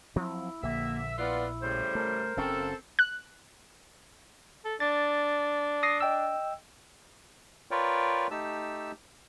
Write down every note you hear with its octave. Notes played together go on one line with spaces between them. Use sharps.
F3 F#3 C4 E4
A#1 D3 A#3 E5
B3 E4 F4 D5
A2 C#3 G3 C5
A3 A#4
F#1 F#2 C4 C#4 A4
F#6
A4
D4 A6
D#6 A#6 C7
D#5 G5 E6
F4 A#4 B4 C#5 D5 G5
A3 D#4 G4 A5 E6